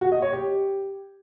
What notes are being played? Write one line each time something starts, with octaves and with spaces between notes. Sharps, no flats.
F#4
D#5
C#5
G4